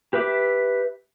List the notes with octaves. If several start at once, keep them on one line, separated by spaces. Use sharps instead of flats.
G4 B4 E5 D6